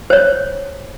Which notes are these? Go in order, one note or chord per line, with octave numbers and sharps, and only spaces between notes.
C5 C#5